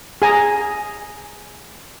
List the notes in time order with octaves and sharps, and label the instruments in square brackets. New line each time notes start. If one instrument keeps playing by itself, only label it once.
[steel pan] G#4 G#5 A#5